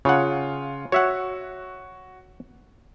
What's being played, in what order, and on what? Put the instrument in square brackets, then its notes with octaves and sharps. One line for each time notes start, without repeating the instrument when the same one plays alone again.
[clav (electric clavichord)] C#3 F#5 [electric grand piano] F4 C#5
[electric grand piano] F#4 [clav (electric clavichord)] C#5 E5 F#5